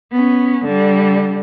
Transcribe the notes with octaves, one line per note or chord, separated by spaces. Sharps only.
B3 C#4
D3 G3